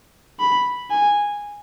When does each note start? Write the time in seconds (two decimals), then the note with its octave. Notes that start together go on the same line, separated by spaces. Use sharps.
0.40 B5
0.91 G#5